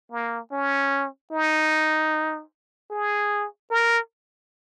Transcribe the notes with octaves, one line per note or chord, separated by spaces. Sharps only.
A#3
C#4
D#4
G#4
A#4